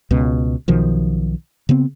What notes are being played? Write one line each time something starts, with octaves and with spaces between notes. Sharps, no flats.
C#2 B2
B1 B2 D#3 F3
C#3 B3 C4